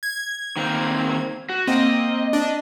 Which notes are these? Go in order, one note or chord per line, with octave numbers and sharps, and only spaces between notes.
G#6
D#3 A#3 C4
F#4
A#3 C4 D#5
D4